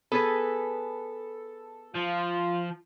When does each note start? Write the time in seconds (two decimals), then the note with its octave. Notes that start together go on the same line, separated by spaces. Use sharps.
0.12 B3 G#4 A4 B4
1.95 F3 F4